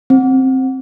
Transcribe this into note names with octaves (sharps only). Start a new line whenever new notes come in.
C4